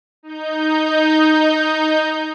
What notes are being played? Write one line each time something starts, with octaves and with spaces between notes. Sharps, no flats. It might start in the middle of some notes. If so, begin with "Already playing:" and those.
D#4 G6